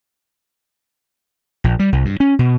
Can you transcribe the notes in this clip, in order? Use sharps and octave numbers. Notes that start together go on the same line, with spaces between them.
A#1
G3
C2
G2
C#4
B2